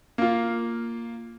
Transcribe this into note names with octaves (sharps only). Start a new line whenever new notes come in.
A#3 F4